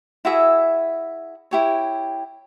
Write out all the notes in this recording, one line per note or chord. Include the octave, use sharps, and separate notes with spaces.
E4 F#4 G#4 E5
E4 G4 C#5